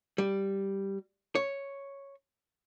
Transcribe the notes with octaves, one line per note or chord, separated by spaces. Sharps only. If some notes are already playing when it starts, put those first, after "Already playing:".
G3
C#5